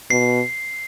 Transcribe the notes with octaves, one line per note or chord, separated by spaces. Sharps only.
B2 C7